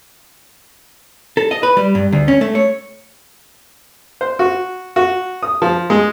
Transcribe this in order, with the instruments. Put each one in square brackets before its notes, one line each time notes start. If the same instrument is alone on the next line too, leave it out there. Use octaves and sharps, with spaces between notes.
[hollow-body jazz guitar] A4
D#5
B4
G3
G2
D2
C#4
A3
C#5
[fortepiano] C5
F#4
F#4
D#6
F3
G#3